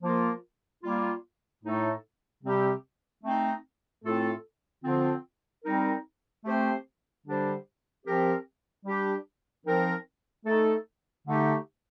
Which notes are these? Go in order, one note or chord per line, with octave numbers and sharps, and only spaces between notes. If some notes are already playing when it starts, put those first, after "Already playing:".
F3 A#3 F4 A#4
G3 A#3 F4
A2 A3 D#4 A4
C3 G3 C4 G4
A3 C4 D#4
A2 A3 C4 F4 A4
D3 F3 C4 F4
G3 C4 D#4 A#4
A3 C4 G4 C5
D3 G3 D4 G4 C5
F3 C4 G4 A#4
G3 D4 G4
F3 C4 D#4 A#4
A3 D#4 A4
D3 A3 D#4 G4